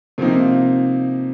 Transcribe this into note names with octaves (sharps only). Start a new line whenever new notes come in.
C3 F3 A#3 D#4